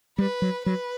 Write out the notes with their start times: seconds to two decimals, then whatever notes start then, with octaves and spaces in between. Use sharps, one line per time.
0.18 G3 B4
0.42 F#3
0.66 F#3 B4